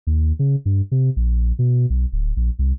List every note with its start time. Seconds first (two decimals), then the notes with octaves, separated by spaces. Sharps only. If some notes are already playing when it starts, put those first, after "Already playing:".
0.07 D#2
0.39 C#3
0.65 G2
0.91 C3
1.16 A#1
1.59 B2
1.90 B1
2.12 D1
2.37 A#1
2.59 C2